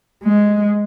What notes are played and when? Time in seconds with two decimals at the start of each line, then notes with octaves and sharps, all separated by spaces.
0.23 G#3